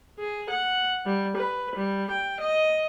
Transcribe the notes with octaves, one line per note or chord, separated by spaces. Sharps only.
G#4
F#5
G3
B4
G3
G5
D#5